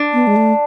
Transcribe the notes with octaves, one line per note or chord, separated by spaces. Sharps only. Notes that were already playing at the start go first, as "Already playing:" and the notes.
Already playing: D4
B3
G#3
A3